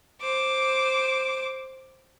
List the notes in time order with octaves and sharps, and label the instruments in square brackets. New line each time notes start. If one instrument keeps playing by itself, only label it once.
[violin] C5 D6